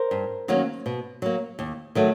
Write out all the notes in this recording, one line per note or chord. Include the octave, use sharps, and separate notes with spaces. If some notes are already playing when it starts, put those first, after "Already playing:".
Already playing: A#4 C5
G2
D#3 F#3 A#3 C#4
B2
F#3 A#3
D#2
D#3 F#3 A3